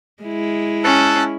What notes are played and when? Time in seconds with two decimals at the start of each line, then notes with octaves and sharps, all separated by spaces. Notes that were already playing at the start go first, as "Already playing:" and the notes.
0.23 G#3 E4
0.84 C#4 A5 E6 F#6